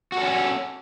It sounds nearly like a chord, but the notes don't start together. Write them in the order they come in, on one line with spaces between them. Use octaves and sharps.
F#4 A4 C#4